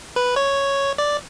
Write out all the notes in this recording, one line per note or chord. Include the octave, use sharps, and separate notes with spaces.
B4
C#5
D5